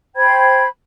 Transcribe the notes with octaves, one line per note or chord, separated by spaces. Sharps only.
C5 G5 B5 G#6